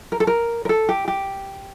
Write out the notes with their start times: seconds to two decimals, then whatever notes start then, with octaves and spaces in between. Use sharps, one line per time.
0.12 A#4
0.20 A4
0.27 A#4
0.65 A#4
0.69 A4
0.89 G4
1.08 G4